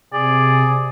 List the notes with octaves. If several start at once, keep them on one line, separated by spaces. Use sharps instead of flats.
C3 G#4 D5